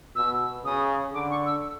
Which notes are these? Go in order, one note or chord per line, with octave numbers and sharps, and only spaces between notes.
B2 E6
C#3 D#6
D3 D6
C#6
E6